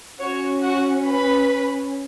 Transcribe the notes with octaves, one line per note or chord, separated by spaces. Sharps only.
C#4 F#4 C#5
F#4 F#5
B4 B5